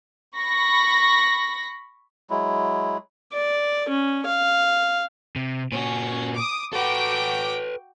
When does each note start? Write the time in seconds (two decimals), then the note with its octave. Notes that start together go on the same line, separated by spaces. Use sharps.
0.36 B5 C#6 A#6
2.30 F#3 G#3 E4
3.33 D5
3.88 C#4
4.26 F5
5.36 C3
5.72 A#2 C#4 F#4
6.36 D6 D#6
6.73 F#4 A4 B4 G5 D6